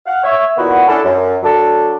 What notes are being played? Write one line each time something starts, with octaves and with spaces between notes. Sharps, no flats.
F5 F#5
C#5 E5
A#2 D#3 B3 E4 F#4
A3 C#4 D4 E4 A4
F#2
F#3 D4 A4